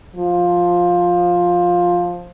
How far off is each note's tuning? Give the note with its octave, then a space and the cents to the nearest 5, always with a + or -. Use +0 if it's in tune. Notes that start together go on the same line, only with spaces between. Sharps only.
F3 +10